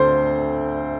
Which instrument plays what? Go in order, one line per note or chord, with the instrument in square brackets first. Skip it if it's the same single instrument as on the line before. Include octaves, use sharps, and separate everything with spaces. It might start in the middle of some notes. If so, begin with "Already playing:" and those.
Already playing: [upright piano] D2 D3 A3 C4 C5 C6